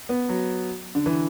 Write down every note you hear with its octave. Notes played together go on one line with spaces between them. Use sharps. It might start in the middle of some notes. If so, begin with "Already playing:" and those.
B3
F#3
D3
E3